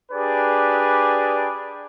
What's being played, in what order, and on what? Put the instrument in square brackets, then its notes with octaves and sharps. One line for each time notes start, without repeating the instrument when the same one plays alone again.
[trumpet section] D4 G4 G#4 B4 D5